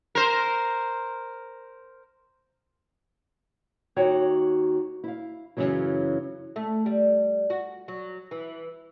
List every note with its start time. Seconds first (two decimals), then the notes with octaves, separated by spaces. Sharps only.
0.15 A#4 C5
3.96 D#2 D#4 F#4 C#5 G5
5.04 E4 F5
5.57 F#2 A#2 C#3 E3 F#3
6.56 A3
6.86 G3
7.50 F#4
7.88 F#3
8.31 E3